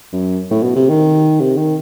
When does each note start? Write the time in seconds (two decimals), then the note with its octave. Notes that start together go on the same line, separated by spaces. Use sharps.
0.13 F#2
0.51 A2
0.63 B2
0.76 C3
0.89 D#3
1.41 C3
1.57 D#3